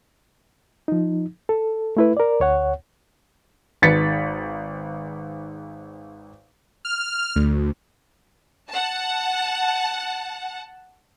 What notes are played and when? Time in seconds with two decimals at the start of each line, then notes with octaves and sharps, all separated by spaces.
0.88 F3 D#4
1.49 A4
1.97 A3 E4 B4
2.17 A#4 D5
2.40 D2 C#5 F#5
3.82 G#1 G#2 B4 A6 B6 C#7
6.85 F6
7.36 D2
8.70 F#5 A5